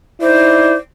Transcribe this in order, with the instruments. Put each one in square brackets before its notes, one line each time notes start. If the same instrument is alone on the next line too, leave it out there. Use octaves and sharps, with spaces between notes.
[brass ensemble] D#4 E4 D5 [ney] C5